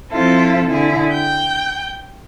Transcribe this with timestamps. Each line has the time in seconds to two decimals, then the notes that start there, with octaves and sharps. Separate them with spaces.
0.11 F3 C4 E4 F4 A4
0.67 D3 E4 G#4
1.11 G5 G6